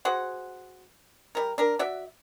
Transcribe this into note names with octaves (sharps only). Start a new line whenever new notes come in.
F#4 G#4 C5 F#5
G3 A#4
D4 A#4
F#4 D5 E5